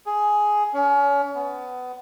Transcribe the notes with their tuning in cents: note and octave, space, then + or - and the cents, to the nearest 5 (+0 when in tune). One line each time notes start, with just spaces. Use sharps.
G#4 +5
C#4 +30
B3 +20